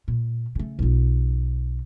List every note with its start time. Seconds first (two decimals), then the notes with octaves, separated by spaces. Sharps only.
0.08 A#2
0.55 C#3 A3
0.79 B1 F4